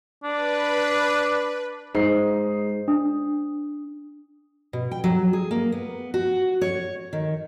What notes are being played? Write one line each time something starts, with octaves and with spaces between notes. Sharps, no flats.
D4 B4
G#2 G#3 D#4 C7
D4 D#6
B2
G5
F#3
G#4
A#3
B3
F#4
C#5
D#3